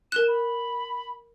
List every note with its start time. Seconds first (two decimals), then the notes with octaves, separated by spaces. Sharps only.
0.12 A#4 F#6 E7
0.28 B5